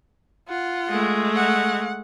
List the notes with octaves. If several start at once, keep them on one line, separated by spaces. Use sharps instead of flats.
F4 F#5
G#3 A3
F#5